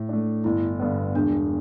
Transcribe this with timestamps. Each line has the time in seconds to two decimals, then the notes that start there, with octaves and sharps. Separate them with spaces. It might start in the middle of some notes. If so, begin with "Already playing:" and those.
Already playing: A2
0.09 A3 D4
0.44 G1 E4
0.80 G2 D3 B3
1.15 E1 D4